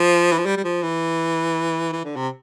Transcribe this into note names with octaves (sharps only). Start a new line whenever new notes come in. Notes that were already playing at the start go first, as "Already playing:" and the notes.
Already playing: F3
E3
F3
G3
G3
F3
E3
E3
D3
C3